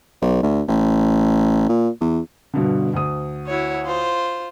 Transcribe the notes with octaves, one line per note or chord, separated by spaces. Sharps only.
B1
D2
A1
A#2
E2
G2 B2 D3
D2 D#6
E4 F#4 C#5
F4 C5